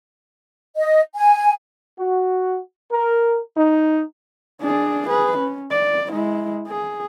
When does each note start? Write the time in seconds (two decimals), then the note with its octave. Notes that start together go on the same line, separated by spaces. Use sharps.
0.77 D#5
1.16 G#5
1.98 F#4
2.91 A#4
3.57 D#4
4.61 D4 G#4
5.07 G#4 B4
5.38 C#4
5.71 D5
6.11 G#3 E4
6.68 G#4